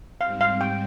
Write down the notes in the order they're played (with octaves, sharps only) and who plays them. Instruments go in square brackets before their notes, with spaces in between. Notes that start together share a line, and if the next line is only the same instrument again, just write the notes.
[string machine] G#2 G3 C4 [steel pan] F5
[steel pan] F5
G5